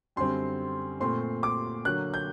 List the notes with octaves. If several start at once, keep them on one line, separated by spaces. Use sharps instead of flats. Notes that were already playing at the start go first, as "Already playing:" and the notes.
F#2 D3 G3 C4 C6
A#2 A3 C4 C6
D6
D3 F#3 A#3 F#6
G6